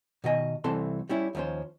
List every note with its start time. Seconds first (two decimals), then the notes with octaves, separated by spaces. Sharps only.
0.24 B2 D#3 D#5 G#5
0.64 C2 E3 C4 A4 A5 C6
1.09 G3 C#4 E4
1.35 D#2 F3 G3 C#4 C5